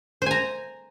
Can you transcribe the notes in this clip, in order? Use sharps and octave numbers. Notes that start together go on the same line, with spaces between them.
C5 G#5 A#5